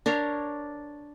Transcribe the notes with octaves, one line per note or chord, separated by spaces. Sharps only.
D4 A#4 C#5 F5